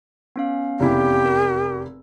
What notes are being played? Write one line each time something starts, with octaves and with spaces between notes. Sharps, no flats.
B3 C#4 F5
F1 E2 E4 G4
A#4